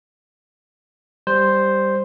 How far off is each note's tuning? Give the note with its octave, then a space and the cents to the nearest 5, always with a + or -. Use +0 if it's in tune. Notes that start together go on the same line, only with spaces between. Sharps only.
G3 +0 C5 +0